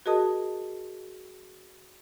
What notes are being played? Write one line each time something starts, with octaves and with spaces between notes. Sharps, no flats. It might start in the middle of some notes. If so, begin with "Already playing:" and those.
F#4 G#4 A#4 D#5 A5 D#6